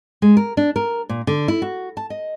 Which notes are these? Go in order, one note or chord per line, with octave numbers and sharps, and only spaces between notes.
G#3
A#4
D4
A#4
A#2
D3
E4
F#4
A5
D#5